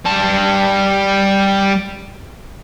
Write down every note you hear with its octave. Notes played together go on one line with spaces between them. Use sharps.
G3 A5